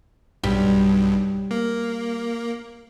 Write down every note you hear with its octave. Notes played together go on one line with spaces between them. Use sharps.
B1 G2 G3
A#3